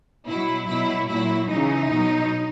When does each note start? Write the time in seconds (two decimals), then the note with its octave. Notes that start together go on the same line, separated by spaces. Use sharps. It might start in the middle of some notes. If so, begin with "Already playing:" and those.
0.27 B2 F#3 E4
0.67 B2 F#3 E4
1.09 A#2 F#3 E4
1.49 C#3 E3 D#4
1.91 B2 F#3